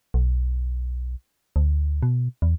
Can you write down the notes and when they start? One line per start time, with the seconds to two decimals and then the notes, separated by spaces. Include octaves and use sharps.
0.14 B1
1.56 D2
2.03 B2
2.42 E2